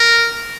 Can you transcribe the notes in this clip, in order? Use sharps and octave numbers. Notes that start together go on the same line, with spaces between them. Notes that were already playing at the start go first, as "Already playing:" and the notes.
Already playing: A#4